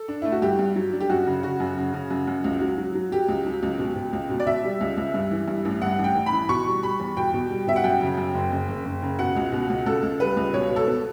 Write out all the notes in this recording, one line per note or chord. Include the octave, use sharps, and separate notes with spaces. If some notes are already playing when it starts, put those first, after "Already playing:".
Already playing: A4
D4
A3 E4
F#4
G2 G4
G2
F#3
D4
G4
F#2 F#4
C#3
C#3 F#4
F#2
C#3
C#3
F#2
F#2
C#2
F#3
F#3
F#3
F#3 G4
C#2
F#3
C#2
B2
B2
C#2
B2
D5
B2 E5
G3
C#2
C#2
G2
E3
G2
A1
G2 F#5
A1
G5
A1
B5
E3
B2 C#6
G3
G3 B5
E2
B2 G5
B2
G3
B2 E5
F#5
F#2 G5
C#3
F#2
F#1
F#1
F#1
F#1
C#3
B2 F#5
C#2
B2
C#2
C#2 A4
C#2
G3 B4
C#2
B2 C#5
B2
A4
B3